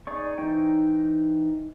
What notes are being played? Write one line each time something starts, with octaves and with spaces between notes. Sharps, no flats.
D#4 G#4 D5 C#6
E3 D#4 C5 G5